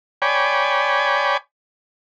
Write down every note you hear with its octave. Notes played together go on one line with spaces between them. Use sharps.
C#5 D5 G5 G#5 B5